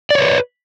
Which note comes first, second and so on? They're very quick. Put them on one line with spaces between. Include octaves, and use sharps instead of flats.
D5 C#5 B4